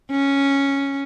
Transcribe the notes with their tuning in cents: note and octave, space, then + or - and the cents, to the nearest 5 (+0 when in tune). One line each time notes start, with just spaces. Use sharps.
C#4 +0